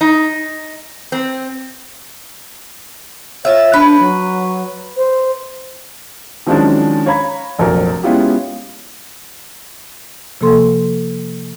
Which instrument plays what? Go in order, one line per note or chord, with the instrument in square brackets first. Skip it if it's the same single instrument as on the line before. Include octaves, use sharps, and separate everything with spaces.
[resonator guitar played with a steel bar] D#4
C4
[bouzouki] F4 E5 [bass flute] C#5
[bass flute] D4 [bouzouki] B4
[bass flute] F#3
C5
[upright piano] D#3 F3 F#3 G#3 C#4 D4
C#5 F5 A#5 B5 G#6
F1 A#1 F#3 A#4
G#3 B3 C#4 E4 F4 G4
[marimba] C3 F3 A#3 A4 C6